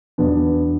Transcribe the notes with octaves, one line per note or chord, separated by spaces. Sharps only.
E2 B2 B3 D4